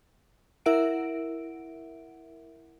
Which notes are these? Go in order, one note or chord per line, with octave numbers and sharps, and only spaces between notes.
E4 A#4 E5 F#5 D7